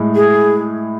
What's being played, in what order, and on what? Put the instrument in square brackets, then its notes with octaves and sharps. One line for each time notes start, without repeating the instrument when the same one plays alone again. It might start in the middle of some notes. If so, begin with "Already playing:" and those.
Already playing: [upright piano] A2 G#3
[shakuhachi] G#4